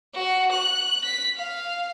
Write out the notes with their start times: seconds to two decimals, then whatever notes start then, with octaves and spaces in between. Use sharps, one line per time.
0.14 F#4
0.52 F#6
1.05 B6
1.36 F5